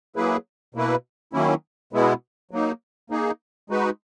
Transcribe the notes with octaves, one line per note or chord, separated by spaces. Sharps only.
F#3 A#3 E4 G#4 B4
B2 A#3 E4 B4
D#3 F#3 A#3 C#4 E4
B2 G#3 B3 E4
F#3 A#3 D#4
A#3 D#4 G#4
G#3 D#4 F#4 B4